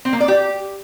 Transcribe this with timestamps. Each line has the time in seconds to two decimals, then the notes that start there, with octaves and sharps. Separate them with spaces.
0.05 C4
0.13 A#3
0.20 D5
0.28 G4